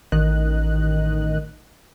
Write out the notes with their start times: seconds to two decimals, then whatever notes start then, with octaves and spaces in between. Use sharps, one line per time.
0.12 A1 D#3 D#5 F#6